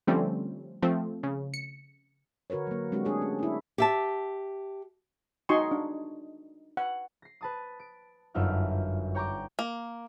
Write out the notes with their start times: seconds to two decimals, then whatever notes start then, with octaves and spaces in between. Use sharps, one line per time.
0.07 D3 F3 G3 A3 C4 C#4
0.82 F3 A3 C4
1.23 C#3
1.54 C#7
2.50 D3 F#4 A#4 B4 C#5
2.67 F#3 A#3
2.92 G#3 C4 D4 F#4 G4
3.05 G#3 A3 D4 G#4 C#5
3.22 C#4
3.39 D4 E4
3.78 G4 E5 A5
5.49 D#4 F#4 D#5 G#5 C6 C#6
5.71 D4
6.77 F#5
7.22 A#6 C7
7.41 B4 A5 D#6
7.80 D7
8.34 G1 F#2 D#4 F4 E5 F6
9.15 C#5 G5 A#5 C#6 D6
9.59 A#3